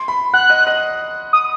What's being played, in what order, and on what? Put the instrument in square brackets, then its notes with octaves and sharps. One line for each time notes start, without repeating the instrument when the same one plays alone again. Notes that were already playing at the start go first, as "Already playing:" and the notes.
Already playing: [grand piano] C6
B5
[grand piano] F#5 [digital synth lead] F#6
[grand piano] D#5
D#5
[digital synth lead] D#6